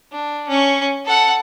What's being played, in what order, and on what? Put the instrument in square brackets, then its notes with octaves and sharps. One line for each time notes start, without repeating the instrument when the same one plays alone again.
[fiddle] D4
C#4 C#6
A4 F#5